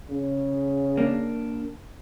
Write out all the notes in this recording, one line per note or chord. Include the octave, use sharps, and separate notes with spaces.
C#3
A#3 D4